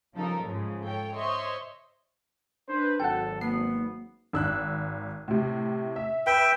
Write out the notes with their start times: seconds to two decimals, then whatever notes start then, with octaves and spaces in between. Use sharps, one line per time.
0.13 C#3 F3 G3 D#4 A4 A#4
0.42 G#2 C#3 F3 G#3
0.84 A4 C#5 G5
1.15 C5 C#5 D#5 E5 C6 C#6
2.69 D4 B4 C5
3.00 G#1 F#3 A4 F#5 G5
3.41 A#3 B3 C7
4.33 G#1 E6 F#6
5.28 A2 C3
5.96 E5
6.27 B4 E5 G5